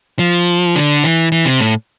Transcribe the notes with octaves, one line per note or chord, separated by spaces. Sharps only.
F3
D3
E3
E3
C3
A2